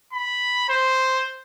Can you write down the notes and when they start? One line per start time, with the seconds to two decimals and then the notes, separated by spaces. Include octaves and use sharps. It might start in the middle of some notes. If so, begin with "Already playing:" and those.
0.13 B5
0.69 C5